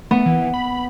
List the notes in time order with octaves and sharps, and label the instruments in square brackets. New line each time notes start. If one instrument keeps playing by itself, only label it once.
[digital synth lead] A3 [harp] B3
[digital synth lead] E3
B5